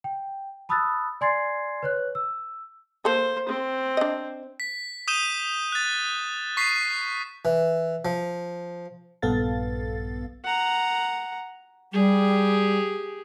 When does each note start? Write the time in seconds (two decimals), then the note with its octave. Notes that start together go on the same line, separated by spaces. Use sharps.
0.04 G5
0.69 A5 B5 D#6 E6 F#6 A6
1.21 D5 G#5 C6 G#6 A6 C7
1.83 B4 C#5 F#6
2.15 E6
3.05 A#3 A4 C5
3.49 C4
3.97 D4 D#5
4.60 B6
5.08 D#6 G6 D#7 E7 G7
5.72 F#6 A6
6.57 C#6 B6 C7 D#7
7.45 E3
8.05 F3
9.22 A#1 G2 B3 A4 F5 A6
10.45 F#5 A#5
11.93 G3 G4 G#4